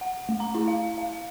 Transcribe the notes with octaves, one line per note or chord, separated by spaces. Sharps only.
F#5
A3
A#5
E4
F5
F5